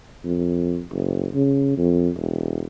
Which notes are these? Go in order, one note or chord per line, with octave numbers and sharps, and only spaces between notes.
F2
F#1
C#3
F2
E1